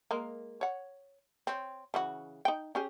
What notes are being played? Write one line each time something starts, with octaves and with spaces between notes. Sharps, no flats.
G#3 A#3 A#4
C#5 F#5
C4 C#5
C#3 E3 F#4
D#4 G5
C#4 G4 G#4